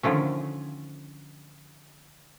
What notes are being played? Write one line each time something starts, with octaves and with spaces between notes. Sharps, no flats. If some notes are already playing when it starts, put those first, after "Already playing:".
D3 D#3 F3 A3 C#4